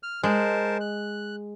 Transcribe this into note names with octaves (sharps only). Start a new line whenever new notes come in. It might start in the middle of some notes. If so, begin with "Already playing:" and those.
F6
G#3 A#4 C5 A5
F#6